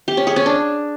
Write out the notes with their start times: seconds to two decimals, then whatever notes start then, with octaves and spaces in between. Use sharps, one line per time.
0.08 G4
0.17 C#4
0.27 G#4
0.36 C#4
0.46 D4